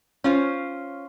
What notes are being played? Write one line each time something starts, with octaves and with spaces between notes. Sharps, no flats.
C#4 F4 C5